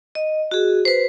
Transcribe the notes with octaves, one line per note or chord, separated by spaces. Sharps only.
D#5
F#4 G#4
B4 C5